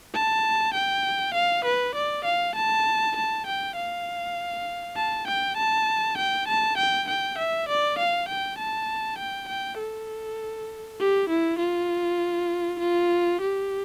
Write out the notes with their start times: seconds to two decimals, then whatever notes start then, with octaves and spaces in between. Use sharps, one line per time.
0.14 A5
0.75 G5
1.35 F5
1.65 B4
1.95 D5
2.25 F5
2.56 A5
3.17 A5
3.47 G5
3.76 F5
4.96 A5
5.28 G5
5.57 A5
6.18 G5
6.48 A5
6.78 G5
7.08 G5
7.38 E5
7.69 D5
7.99 F5
8.28 G5
8.58 A5
9.18 G5
9.48 G5
9.79 A4
11.00 G4
11.30 E4
11.59 F4
12.80 F4
13.41 G4